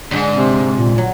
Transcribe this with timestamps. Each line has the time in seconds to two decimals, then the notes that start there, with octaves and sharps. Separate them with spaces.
0.11 D#2 G#2 D3 G#3
0.36 C3
0.73 A#2
0.98 F#3